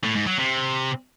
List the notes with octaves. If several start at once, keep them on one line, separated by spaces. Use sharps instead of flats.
A2
G#2
F#3
C3